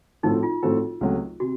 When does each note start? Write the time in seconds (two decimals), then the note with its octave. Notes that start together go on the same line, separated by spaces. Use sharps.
0.23 A2 F3 C4 D#4 F#4 A4
0.43 F4
0.63 A2 F3 C4 F#4 A4
1.01 C#2 C3 F#3 A3
1.40 C3 F#4